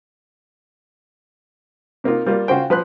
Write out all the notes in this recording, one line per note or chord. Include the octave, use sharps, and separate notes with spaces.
C3 A#3 D#4 F4
G3 A#3 F4
C#3 F4 F#4 C5 G5
F3 B4 C6 F#6